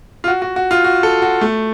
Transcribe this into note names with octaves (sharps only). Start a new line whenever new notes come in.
F4
F#4
F#4
F#4
F4
F#4
A4
F#4
A3